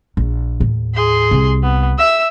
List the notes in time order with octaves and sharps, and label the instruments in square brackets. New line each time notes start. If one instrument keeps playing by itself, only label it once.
[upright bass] A#1
D#2 A2
[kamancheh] G#4 C6
[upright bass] C2
[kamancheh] B3
E5 E6